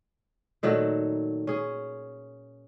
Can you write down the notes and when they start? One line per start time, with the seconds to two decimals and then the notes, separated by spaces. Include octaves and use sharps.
0.63 A#2 D#3 F#3 A3
1.47 C#4 G#4